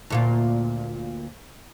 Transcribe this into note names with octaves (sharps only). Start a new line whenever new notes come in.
D2 A#2 F4